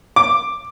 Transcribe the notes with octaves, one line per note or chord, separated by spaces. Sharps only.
D6